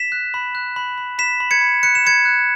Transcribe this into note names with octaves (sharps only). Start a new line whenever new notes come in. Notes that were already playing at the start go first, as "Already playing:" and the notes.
Already playing: B6 E7
F#6
B5
F#6
B5
B5
B5 B6 E7
B5
G#6 C#7
B5
F#6 C#7
E7
B5 G#6 C#7
F#6